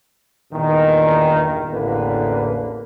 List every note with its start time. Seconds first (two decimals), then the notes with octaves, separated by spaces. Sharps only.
0.52 E2 G2 A#2 D#3
1.71 A1 E2 A2 D3 A#3 B4